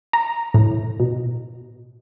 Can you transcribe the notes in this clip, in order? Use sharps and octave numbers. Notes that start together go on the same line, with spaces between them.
A#5
A2
B2